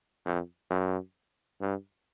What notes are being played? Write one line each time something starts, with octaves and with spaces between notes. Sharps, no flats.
F2
F#2
G2